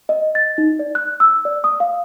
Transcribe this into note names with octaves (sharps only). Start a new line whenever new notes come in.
D#5
A6
D#4
D5
F#6
E6
D5
D#6
F5